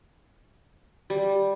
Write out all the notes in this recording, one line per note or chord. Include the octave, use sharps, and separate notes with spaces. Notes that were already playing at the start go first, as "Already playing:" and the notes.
G3